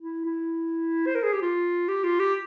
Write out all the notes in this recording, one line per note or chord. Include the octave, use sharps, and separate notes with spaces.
E4
E4
C5
A#4
G#4
G4
F4
G4
F4
G4